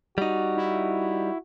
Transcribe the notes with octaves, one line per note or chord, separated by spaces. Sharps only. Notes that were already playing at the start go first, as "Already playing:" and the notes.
G3 D#4 F#4
E4